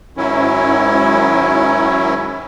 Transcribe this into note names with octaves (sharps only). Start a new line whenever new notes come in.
G#2 D#3 F#3 C#4 E4